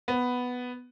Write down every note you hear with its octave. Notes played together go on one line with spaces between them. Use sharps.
B3